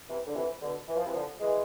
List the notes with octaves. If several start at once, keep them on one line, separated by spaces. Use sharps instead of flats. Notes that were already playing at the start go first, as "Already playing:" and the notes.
C3 E3
D3
C3 E3
B2 D3
E3
F3
C3 E3
D3 F3
E3 G#3